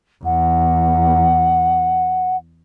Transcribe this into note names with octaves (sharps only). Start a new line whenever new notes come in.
E2 F#5